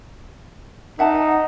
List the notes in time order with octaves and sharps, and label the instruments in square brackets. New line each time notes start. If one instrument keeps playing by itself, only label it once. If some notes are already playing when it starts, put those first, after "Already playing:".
[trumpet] D#4 [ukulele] E5 F#5 A5